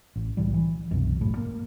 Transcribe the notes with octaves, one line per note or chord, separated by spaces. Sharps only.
A1
C2 A2 E3 G3
E3
C2 F#2 B2
G1 F#2 A2
A#3